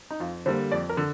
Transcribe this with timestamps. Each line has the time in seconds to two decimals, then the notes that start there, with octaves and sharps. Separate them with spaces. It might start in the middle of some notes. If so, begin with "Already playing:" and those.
0.11 D#4
0.20 F2 F4
0.46 D3 G3 A#3 C5
0.72 F2 D5
0.89 A#4
0.97 D3